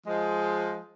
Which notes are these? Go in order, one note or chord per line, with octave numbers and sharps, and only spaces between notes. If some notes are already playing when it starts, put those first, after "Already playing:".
F3 G#3